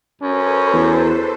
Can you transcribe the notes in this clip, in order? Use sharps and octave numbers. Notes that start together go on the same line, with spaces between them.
F#2 C#4 A4 B4 C5
E2